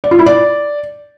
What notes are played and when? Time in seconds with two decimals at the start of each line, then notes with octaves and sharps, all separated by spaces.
0.04 D5
0.11 F4
0.19 E4
0.26 D5